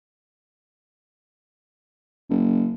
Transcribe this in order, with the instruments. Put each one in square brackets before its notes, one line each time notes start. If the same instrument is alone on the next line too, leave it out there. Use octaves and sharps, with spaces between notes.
[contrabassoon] F#1